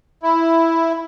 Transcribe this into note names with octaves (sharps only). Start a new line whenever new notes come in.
E4